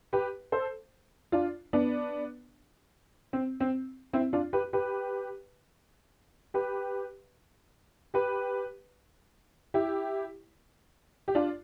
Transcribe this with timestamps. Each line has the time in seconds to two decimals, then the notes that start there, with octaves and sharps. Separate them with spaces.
0.13 G4 B4
0.52 A4 C5
1.32 D4 F4
1.73 B3 D4
3.33 C4
3.60 C4
4.13 C4 E4
4.33 D4 F4
4.53 G4 B4
4.73 G4 B4
6.54 G4 B4
8.14 G4 B4
9.74 E4 G4
11.28 G4
11.35 D4 F4